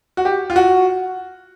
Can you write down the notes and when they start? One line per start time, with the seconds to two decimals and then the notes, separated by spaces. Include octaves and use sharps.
0.17 F#4
0.25 G4
0.50 F4
0.56 F#4